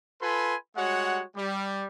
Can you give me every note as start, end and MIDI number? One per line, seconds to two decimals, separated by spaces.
0.21 0.56 65
0.21 0.56 69
0.21 0.56 71
0.21 0.56 80
0.21 0.56 83
0.21 0.56 84
0.77 1.22 55
0.77 1.22 56
0.77 1.22 66
0.77 1.22 73
0.77 1.22 78
1.36 1.86 55